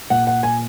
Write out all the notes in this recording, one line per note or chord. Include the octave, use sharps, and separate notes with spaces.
A#2 F#5
F#5
G#5